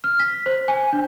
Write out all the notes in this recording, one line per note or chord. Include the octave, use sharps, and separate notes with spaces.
F6
B6
C5
G#5
D4